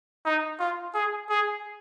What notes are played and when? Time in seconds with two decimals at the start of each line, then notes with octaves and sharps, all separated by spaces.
0.25 D#4
0.59 F4
0.94 G#4
1.30 G#4